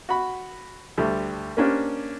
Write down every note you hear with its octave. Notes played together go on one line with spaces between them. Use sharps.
F#4 F#5 B5
D2 G3 A3
A#3 C#4 D4 G4 C5